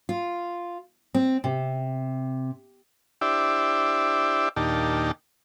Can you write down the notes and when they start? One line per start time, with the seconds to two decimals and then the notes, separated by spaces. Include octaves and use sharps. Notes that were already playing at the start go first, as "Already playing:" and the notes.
0.09 F4
1.14 C4
1.44 C3
3.21 D4 E4 G4 C5 D5 E5
4.56 D#2 A#2 D4 D#4 G4 A5